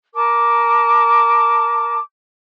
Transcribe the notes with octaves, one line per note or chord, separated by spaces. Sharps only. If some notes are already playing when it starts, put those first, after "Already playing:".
A#4 A5 D6